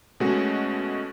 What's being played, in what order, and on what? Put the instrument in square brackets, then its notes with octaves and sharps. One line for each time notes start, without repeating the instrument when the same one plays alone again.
[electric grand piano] B2 G#3 A3 C#4 F#4